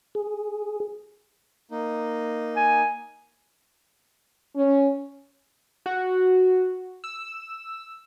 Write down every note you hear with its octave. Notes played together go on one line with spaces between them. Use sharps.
G#4
A#3 D#4
G#5
C#4
F#4
E6